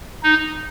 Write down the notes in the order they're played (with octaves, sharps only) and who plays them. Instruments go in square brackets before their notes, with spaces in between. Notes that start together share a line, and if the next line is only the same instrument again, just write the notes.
[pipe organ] D#4